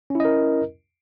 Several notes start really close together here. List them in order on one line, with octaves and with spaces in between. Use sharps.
C#4 E4 D#5 A#4